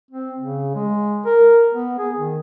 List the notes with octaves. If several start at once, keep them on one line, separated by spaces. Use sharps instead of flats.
C4
C#3
G#3
A#4
B3
G#4
D#3